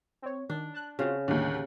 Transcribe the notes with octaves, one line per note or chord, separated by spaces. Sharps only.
C4 C#5
D#3 D4
A5 F#6
C#3 C4 F4 F#4
D#2 A2 D3 D#3 G3